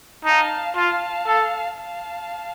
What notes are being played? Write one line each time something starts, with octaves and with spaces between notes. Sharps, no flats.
D#4 F5 A5
F4 F5 A5
A4
F5 A5